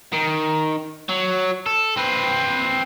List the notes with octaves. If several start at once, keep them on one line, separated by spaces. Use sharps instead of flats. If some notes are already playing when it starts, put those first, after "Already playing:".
D#3
F#3
A4
C4 B4